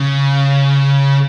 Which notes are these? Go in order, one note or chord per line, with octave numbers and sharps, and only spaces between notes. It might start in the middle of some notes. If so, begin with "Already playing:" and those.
Already playing: C#3